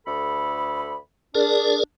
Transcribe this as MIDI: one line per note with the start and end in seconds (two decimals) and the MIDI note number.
0.06 0.95 38
0.06 0.95 69
0.06 0.95 83
1.35 1.76 62
1.35 1.84 68
1.35 1.84 70
1.35 1.84 74